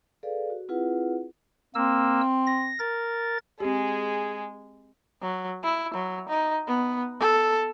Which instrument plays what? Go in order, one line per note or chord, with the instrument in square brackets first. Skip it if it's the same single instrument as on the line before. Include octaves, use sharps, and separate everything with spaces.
[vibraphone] G#4 A4 B4 D5 F5
F#4
C4 E4 F4 G#4 B4 F#5
[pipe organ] A#3 E6 [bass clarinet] C4
[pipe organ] A#6
A#4 A6
[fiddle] G#3 [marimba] C4 G4 [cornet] G#4
[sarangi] F#3
E4
F#3
D#4
B3
A4